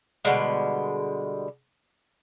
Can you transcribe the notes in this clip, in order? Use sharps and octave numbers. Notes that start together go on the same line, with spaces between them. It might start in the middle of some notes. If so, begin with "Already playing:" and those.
B2 D3 G3 G#3